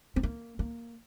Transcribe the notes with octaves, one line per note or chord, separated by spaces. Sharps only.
C4
A#3
A#3